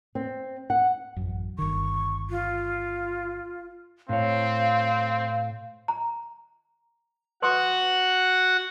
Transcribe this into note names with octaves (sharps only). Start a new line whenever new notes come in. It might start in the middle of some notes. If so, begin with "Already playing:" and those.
C4
F#5
A1 F#2
G1 D#3 C#6
F4
A2 C4 C#5 F5
A#5
F#4 B4 F#5 C6 D#6